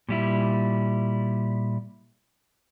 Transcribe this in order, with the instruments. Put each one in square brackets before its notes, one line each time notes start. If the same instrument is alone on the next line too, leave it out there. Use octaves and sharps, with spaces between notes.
[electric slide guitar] A#2 G3 E4